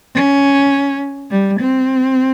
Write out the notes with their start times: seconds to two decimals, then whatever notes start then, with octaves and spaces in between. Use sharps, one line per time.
0.15 C#4
1.31 G3
1.60 C4